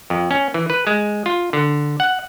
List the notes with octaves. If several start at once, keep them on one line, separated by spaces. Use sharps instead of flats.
F2
C#4
E3
B4
G#3
F4
D3
F#5